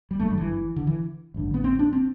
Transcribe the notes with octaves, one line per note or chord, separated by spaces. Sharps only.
G3
G1 F#2 D3 A3
G3
E3
D3
E3
A1 G2 D3
B3
C4
D4
C4